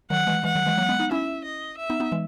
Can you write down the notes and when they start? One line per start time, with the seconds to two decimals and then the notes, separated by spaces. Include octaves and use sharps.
0.10 D#3 F#3 F#5
0.27 E3 G#3
0.43 E3 G#3 F#5
0.56 D#3 F#3
0.66 E3 G#3
0.78 F#3 A#3
0.89 G#3 B3
1.00 B3 D#4
1.11 C#4 E4 E5
1.44 D#5
1.78 E5
1.90 B3 D#4
2.00 B3 D#4
2.12 E3 G#3